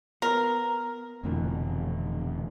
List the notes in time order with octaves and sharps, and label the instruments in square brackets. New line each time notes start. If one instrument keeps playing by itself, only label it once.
[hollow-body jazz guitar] B3 [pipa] A#4
[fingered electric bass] F1 F2 A3 [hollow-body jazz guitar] B2 D3 E3